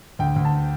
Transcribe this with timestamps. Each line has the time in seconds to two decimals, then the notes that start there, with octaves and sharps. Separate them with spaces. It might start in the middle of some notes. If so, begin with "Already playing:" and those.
0.19 D2 G5
0.36 D2
0.45 A5